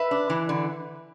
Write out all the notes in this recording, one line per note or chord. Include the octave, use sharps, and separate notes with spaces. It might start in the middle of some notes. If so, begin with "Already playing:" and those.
Already playing: B4 E5
D4
E3
D3